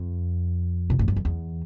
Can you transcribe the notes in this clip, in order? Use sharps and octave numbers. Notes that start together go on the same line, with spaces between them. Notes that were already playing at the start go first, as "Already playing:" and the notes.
Already playing: F2
B2
A2
G2
F2
E2